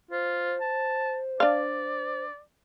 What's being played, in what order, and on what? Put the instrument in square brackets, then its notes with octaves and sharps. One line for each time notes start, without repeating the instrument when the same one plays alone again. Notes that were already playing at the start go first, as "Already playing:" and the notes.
[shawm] F4 [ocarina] C5
[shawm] A5
[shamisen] D4 F5 [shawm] D5